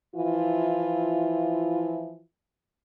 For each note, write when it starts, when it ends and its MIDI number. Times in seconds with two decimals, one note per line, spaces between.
0.15 2.20 52
0.15 2.20 53
0.15 2.20 64
0.15 2.20 65